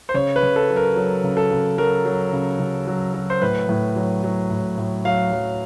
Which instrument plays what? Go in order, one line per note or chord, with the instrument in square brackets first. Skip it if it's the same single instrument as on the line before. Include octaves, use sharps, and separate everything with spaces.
[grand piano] C5
C#3 C#5
B4
C#3
A4
F#3
A#4
F#3
C#3
A4
C#3
F#3 A#4
F#3
C#3
C#3
F#3
F#3
C5
A2 B4
A2
F#3
F#3
A2
A2
F#3 F5
F#3